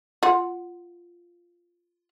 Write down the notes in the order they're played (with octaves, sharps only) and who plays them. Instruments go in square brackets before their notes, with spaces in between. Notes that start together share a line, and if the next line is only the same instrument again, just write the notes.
[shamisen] F4 F#5